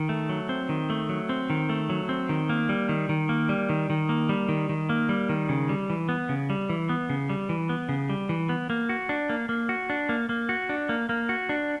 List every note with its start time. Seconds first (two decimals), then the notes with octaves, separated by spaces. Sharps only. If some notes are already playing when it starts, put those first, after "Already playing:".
Already playing: D#3
0.09 A3
0.29 F#3
0.49 C4
0.69 D#3
0.90 A3
1.09 F#3
1.29 C4
1.50 D#3
1.69 A3
1.89 F#3
2.09 C4
2.29 D#3
2.49 A#3
2.69 G3
2.89 D#3
3.09 D#3
3.29 A#3
3.49 G3
3.69 D#3
3.90 D#3
4.09 A#3
4.29 G3
4.49 D#3
4.69 D#3
4.89 A#3
5.09 G3
5.29 D#3
5.49 C#3
5.69 G3
5.90 E3
6.09 B3
6.29 C#3
6.50 G3
6.69 E3
6.89 B3
7.09 C#3
7.30 G3
7.49 E3
7.69 B3
7.89 C#3
8.09 G3
8.29 E3
8.49 B3
8.70 A#3
8.89 F#4
9.09 D4
9.29 A#3
9.49 A#3
9.69 F#4
9.90 D4
10.09 A#3
10.29 A#3
10.49 F#4
10.69 D4
10.89 A#3
11.09 A#3
11.29 F#4
11.49 D4